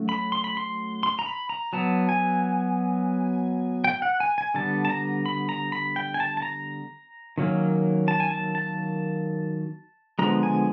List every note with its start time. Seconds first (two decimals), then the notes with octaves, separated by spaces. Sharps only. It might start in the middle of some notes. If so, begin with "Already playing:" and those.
Already playing: F#3 A3 C#4
0.09 B5
0.32 C6
0.44 B5
0.57 C6
1.03 C6
1.19 A#5
1.26 B5
1.49 A#5
1.73 F#3 B3 A5
2.09 G#5
3.84 G5
4.02 F#5
4.20 G#5
4.38 G#5
4.54 D3 G3 B3 A5
4.85 A5
4.90 A#5
5.26 B5
5.49 A#5
5.72 B5
5.96 G5
6.14 G#5
6.20 A5
6.37 A5
6.42 A#5
7.38 D#3 F#3 A#3 C#4
8.08 A5
8.20 G#5
8.31 A5
8.55 A5
10.19 D3 F3 G#3 B3 A#5
10.43 G#5